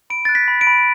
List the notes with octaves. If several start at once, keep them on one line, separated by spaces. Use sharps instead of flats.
B5 D7
F#6 A6
B6
B5
D7
B5